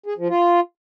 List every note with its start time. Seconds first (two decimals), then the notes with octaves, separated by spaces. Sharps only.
0.06 G#4
0.17 F3
0.29 F4